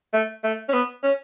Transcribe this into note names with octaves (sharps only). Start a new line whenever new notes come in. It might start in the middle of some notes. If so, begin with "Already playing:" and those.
A3
A3
C#4
B3
C#4